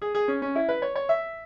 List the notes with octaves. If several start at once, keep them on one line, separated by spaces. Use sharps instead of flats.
G#4
G#4
C#4
C#4
E4
B4
C#5
C#5
E5